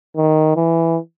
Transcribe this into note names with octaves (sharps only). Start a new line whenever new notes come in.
D#3
E3